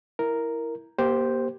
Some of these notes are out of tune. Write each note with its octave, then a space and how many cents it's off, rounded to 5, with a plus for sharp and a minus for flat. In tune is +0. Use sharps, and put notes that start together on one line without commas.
E4 +0 A#4 +0
A#3 +35 G4 +0 C5 +0